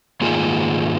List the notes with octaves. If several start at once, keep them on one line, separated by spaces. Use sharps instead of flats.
G#2 D#3 A#3 F4 G#4